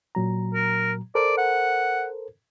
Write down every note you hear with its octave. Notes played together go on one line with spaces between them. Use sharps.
A#2 F#3 A#5
A#4
A4 A#4 C5 D5
F#5